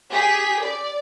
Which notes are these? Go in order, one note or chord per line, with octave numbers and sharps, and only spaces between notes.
G4 G#4 B6
D5